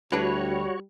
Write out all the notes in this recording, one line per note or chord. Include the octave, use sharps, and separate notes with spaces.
D2 G3 D4 E4 F#4 B4 C#5